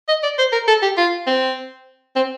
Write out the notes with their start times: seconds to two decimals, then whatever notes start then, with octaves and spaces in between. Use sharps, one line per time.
0.09 D#5
0.23 D5
0.39 C5
0.53 A#4
0.68 A4
0.83 G4
0.97 F4
1.27 C4
2.16 C4